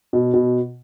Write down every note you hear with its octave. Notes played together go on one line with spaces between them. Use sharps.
B2
B2